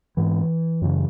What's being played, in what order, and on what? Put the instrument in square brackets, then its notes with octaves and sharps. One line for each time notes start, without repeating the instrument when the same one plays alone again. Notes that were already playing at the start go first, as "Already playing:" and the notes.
[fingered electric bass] G#2 E3
F#2 C#3